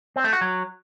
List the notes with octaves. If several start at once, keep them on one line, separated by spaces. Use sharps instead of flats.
C4
A3
F#4
F#3